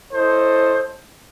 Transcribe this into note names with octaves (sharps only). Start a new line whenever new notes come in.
E4 A4 C5 C#5 D#5